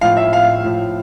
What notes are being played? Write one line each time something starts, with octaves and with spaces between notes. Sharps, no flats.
A2 F3 F5
E5
F5
A2 F3